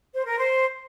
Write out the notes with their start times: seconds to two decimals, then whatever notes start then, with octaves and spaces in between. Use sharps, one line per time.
0.14 C5
0.26 A#4
0.38 C5